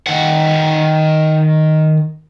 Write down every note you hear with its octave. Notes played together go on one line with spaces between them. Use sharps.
D#3 F#5